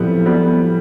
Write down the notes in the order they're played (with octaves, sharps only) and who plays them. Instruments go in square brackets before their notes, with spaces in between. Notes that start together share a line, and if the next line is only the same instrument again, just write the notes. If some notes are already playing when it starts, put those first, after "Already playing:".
Already playing: [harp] A2 F3 C4 G4 [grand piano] G3 B3
[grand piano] G3 B3